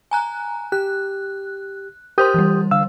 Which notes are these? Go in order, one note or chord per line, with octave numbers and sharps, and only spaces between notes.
G#5 A#5 F#6
G4 F#6
G4 A#4 C5 C6 D#6 G6
E3 G3
D3 F5 E6